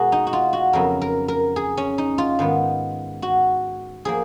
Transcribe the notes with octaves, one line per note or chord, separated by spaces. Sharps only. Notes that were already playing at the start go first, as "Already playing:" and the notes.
Already playing: B2 G#3 F#4 G#4 A#4
D#4
F#4
F4
F#4
F2 C#3 F#3 B3 A#4
A#4
A#4
G#4
C#4
D#4
F4
G#2 D#3 G#3 B3
F#4
F3 A#3 G#4